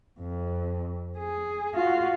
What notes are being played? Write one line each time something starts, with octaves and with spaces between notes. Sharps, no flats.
F2
G#4
F4 F#4